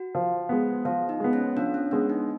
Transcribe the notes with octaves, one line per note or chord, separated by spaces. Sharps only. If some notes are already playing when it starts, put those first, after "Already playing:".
Already playing: F#4
F3
G#3 B3
F3 F4
D#4
G#3 B3
C#4
F3 D4
C#4
G#3 B3 D4
D#4